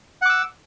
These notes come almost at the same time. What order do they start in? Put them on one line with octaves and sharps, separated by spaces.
F#5 D6 E6